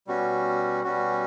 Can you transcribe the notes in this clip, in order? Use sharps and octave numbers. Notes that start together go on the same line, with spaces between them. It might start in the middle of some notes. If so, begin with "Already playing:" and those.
B2 G3 C#4 F#4
B2 G3 C#4 F#4